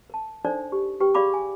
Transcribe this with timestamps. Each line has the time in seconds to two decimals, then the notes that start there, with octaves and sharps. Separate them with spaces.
0.10 A#4 A5
0.45 D4 D#4 A4 A#4 C5 D5
0.72 G4
1.00 G4 B4 G5 C#6
1.15 G4 G#4 D5 F5 B5 D6
1.34 G#5